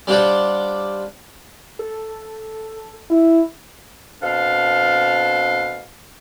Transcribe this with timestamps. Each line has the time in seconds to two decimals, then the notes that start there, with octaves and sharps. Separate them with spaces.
0.07 G3 D4 F4 G4 C5 F#5
1.79 A4
3.10 E4
4.21 B2 C4 D4 A4 F5